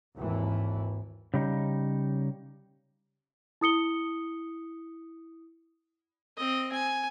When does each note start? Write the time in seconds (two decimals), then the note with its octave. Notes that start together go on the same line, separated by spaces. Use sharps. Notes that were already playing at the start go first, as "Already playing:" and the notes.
0.16 G#1 D#2 E3
1.34 C#3 G3 D#4
3.61 E4 D#6 C#7 G7
6.37 C4 D#5
6.72 G#5